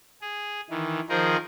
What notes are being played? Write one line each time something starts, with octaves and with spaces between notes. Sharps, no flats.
G#4
D#3 E3
D#3 F3 D#4 G#4 A#4 C5